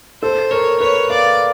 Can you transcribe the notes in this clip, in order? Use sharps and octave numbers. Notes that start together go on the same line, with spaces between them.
A4 C5
A#4 C#5
B4 C#5
D5 F5